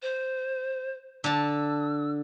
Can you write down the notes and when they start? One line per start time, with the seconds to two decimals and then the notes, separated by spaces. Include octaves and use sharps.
0.02 C5
1.24 D3 A5 E6